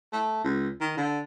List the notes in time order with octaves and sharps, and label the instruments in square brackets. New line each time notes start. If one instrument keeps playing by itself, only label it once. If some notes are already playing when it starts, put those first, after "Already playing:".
[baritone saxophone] A3
C#2
D#3
D3